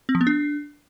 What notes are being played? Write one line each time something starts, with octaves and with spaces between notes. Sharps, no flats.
C4
F3
B3
D4